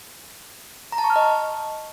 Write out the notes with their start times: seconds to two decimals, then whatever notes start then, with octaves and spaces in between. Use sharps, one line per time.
0.92 A#5
0.98 A5
1.04 C#6
1.10 F6
1.16 D#5